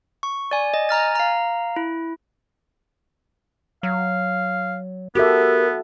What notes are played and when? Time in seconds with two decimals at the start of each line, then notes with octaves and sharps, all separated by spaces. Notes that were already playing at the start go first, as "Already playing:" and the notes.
0.23 C#6
0.51 D5 G#5
0.74 D#5
0.89 G#5 A#5 F6 A6
1.15 F5 A#5
1.76 E4
3.83 F#3 F5
5.15 B3 F#4 G4 A4 A#4 E5